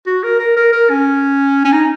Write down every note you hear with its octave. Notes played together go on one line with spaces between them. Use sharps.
F#4
A#4
A#4
A#4
A#4
C#4
C#4
D#4